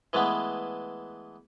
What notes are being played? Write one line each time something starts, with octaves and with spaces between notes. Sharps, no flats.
E3 G#3 A3 B3